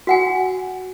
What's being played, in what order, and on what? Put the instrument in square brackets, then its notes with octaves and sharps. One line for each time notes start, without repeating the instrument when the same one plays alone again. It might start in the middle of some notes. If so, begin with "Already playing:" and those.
[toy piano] F#4 F#5 G#5